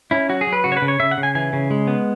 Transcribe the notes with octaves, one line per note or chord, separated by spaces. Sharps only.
C#4 E4
F#3 F#4
G#4
F#3
B4
C#3 F#4
C#5
B4
C#3
C#5
C#3 E5
F#5
C#3
G#5
E3 G#5
C#3
G#3
B3